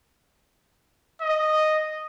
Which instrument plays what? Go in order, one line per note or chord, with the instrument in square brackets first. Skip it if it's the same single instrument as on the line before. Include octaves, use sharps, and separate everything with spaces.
[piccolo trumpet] D#5